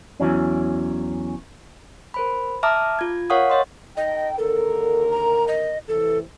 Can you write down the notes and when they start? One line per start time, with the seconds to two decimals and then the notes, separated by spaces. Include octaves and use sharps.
0.20 E2 G2 E3 F#3 C#4
2.14 A#4 C5 B5
2.63 E5 A5 A#5 D6 D#6 F6
2.99 F4 G#6
3.30 A#4 C#5 F5 F#5 C#6 D#6
3.50 C#5 D#5 C6
3.97 D#4 A4 D#5 G5
4.38 D#2 D3 A4 A#4
5.11 A#5
5.48 D#5
5.88 A2 C3 E3 A4